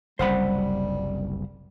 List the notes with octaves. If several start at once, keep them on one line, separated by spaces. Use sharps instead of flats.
F#1 C2 G3 C5 F#5 B5